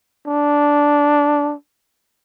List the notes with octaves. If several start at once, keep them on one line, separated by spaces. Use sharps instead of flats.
D4